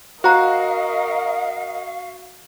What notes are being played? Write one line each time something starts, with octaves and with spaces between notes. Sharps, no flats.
F#4 A#4 C5 D#5 F5 A#5